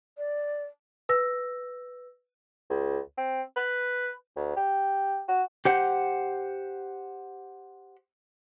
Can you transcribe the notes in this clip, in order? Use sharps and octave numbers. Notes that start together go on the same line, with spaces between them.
D5
B4 E6 A#6
C#2
C4
B4
D2
G4
F#4
G4 C5 F#5